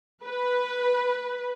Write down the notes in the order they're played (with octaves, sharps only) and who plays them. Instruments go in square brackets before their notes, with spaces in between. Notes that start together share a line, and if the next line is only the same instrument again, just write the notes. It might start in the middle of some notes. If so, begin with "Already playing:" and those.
[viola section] B4